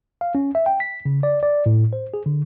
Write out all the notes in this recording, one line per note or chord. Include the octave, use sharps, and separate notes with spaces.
F5
C#4
E5
G5
B6
C#3
D5
D5
A2
C5
G#4
D3